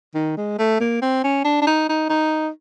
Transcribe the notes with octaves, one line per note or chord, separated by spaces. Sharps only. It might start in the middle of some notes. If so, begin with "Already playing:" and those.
D#3
G#3
A3
A#3
C4
C#4
D4
D4
D#4
D#4
D#4